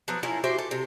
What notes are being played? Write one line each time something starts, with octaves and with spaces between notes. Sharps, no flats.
F3 F#3 B3 E4
C#4 E4 F4 A#4
F#4 G4 C5 E5
A4
C3